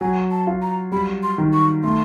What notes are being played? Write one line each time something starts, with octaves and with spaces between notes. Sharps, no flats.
F#3 G#5
A5
F4
A#5
G3 B5
C6
D#3
C#6
A3 C6